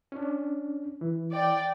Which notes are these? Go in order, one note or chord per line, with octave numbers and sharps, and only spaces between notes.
C#4 D4
E3
D5 G5